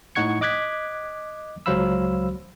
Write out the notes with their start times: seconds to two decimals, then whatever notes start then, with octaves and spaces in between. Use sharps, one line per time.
0.15 A2 D#4 F#5 C#6 G#6 C#7
0.41 D#5 D6 F#6 G#6 B6
1.66 C#2 F#3 C5 F5 B5 E6